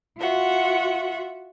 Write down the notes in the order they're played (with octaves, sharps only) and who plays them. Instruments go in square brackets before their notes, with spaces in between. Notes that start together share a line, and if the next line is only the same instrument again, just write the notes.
[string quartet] F4 F#4 E5 F#5